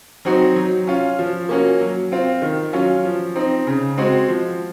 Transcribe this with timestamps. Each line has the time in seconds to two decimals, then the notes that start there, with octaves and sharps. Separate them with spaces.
0.25 F#3 C4 D#4 F#4
0.56 F#3
0.87 C#4 F4
1.19 F3
1.49 A#3 C#4 F#4
1.81 F#3
2.12 C4 F4
2.42 D#3
2.73 F#3 C#4 F4
3.05 F3
3.36 C4 D#4
3.67 C#3
3.98 G#3 C4 F#4
4.28 F3